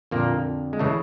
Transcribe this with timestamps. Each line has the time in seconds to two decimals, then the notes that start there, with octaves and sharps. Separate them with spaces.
0.11 F2 A#2 D3 A#3
0.73 G#3
0.79 C#3 E3 A3